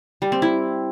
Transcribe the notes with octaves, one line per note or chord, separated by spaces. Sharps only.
G3
C4
E4